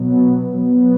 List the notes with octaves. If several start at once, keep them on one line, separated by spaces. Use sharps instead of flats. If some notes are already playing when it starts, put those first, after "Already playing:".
Already playing: B2 F#3 B3
B2 F#3 B3